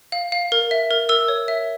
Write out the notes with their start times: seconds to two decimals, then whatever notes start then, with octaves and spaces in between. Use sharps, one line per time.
0.12 F5
0.32 F5
0.52 A#4
0.71 E5
0.91 A#4
1.09 A#4 E6
1.28 C#5
1.48 E5